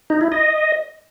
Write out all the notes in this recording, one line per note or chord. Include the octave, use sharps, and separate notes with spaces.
D#4
E4
D#5